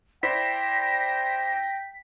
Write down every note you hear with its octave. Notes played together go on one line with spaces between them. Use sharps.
E4 C5 D5 G5 A#6 B6